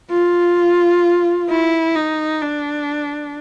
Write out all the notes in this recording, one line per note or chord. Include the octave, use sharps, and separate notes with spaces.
F4
E4
D#4
D4